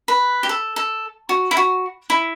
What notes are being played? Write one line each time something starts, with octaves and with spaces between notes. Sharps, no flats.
B4
G4
A4
A4
F#4
E4
F#4
E4